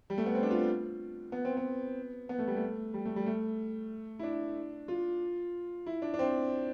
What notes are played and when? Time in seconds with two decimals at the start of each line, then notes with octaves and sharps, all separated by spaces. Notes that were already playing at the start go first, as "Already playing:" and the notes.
0.10 G3
0.18 A3
0.26 B3
0.35 C4
0.43 D4
0.50 F4
1.32 B3
1.45 C4
1.57 B3
2.29 B3
2.39 A3
2.47 G3
2.56 A3
2.94 G3
3.05 A3
3.16 G3
3.26 A3
4.19 E4
4.23 D4
4.88 F4
5.86 E4
6.02 D4
6.14 D4
6.19 C4